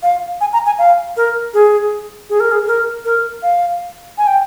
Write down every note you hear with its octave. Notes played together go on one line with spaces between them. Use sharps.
F5
G#5
A#5
G#5
F5
A#4
G#4
G#4
A#4
G#4
A#4
A#4
F5
G#5
G5